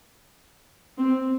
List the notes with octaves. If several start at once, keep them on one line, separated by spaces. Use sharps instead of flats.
C4